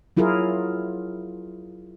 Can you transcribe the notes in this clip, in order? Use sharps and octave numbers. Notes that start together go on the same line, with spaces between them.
F#3 E4 F4 G#4 A#4